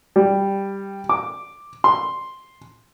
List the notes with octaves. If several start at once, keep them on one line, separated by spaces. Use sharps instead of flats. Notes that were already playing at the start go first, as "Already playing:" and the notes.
G3
D6
C6